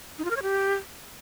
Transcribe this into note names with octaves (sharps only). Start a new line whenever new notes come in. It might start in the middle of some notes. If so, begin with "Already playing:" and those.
D#4
F4
A#4
C#5
G4